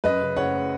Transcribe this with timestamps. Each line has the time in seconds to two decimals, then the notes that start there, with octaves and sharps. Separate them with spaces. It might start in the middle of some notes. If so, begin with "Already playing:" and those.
0.04 F#2 B4 D#5
0.21 C#3
0.37 F#1 C#5 F#5